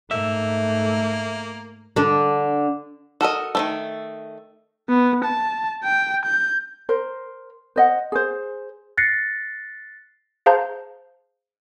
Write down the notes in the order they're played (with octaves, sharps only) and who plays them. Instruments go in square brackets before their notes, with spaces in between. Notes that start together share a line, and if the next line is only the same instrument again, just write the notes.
[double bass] G#2 A3 [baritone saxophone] A#3 [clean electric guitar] E5
[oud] D3 D4
[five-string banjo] F#4 A4 A#4 D#5
D#3 F3 A3
[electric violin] B3
A5
G5
G6
[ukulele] A#4 C5
C5 D#5 F#5
G#4 C5
[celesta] F#6 A6 A#6 C7 C#7
[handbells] G#4 C5 F5 A5 A#5 G6